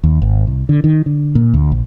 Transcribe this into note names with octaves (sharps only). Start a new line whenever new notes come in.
D#2
G#1
C2
D3
D#3
D3
A#2
D2
A#1